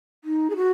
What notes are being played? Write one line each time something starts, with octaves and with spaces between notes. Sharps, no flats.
D#4
G#4
F#4